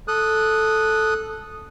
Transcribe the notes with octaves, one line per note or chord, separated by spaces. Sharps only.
A4 D#6 F#6